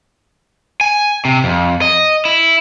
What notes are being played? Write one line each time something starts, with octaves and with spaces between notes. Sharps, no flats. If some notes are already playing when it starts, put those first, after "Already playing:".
G#5
C3
F2
D#5
E4